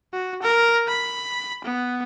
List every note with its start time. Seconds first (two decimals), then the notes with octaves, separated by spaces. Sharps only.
0.13 F#4
0.42 A#4
0.87 B5
1.64 B3